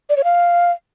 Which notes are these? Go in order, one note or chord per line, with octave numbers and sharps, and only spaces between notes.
D5
C#5
F5